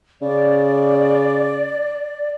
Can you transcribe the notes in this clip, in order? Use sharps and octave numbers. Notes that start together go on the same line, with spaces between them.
C#3 D5